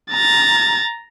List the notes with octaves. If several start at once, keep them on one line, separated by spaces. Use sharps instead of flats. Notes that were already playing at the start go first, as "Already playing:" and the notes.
A#5 A6